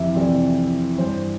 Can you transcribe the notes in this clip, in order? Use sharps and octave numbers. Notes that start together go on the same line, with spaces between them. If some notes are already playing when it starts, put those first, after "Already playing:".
Already playing: F2 C3 E3 E5
F2 C3 E3 D5
G2 E3 C5